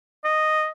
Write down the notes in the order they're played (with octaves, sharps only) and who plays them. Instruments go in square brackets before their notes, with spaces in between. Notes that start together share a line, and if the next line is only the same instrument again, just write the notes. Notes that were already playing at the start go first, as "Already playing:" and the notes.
[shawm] D#5